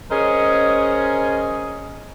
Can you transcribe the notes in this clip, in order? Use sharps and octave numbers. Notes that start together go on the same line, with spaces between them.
C#4 G#4 A#4 C5 C#5 D#5